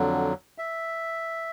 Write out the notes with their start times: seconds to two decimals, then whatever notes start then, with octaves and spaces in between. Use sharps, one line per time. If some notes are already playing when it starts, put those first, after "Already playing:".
Already playing: F2 D3 F#3
0.58 E5